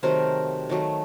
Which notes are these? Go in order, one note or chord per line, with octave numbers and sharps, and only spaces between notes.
C3 D#3 F#3 A3 A#4 C5
D#3 F#3 A3